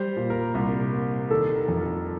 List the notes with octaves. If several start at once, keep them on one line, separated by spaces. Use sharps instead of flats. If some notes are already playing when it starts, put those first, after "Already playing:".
Already playing: G3 C5
A#2
A#4
C2
A#3
D#3 A4
A#4
F2
A#4